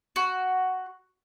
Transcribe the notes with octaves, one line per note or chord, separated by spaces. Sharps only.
F#4